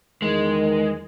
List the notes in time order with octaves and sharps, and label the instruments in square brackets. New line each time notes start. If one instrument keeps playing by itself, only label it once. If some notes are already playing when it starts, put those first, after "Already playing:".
[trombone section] E2 D#3 [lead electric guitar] G#3